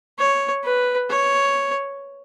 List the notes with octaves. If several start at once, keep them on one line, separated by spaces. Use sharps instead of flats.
C#5
B4
C#5